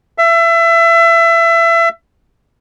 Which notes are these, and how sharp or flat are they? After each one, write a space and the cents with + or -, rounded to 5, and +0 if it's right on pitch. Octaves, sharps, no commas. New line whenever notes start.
E5 +25